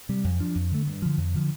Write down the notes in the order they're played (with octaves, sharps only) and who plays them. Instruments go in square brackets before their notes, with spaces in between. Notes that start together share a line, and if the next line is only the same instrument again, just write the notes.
[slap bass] C3 G3
F2
F3 D4
F2
D3 A3
G2
D3 F3
F2
D3 F3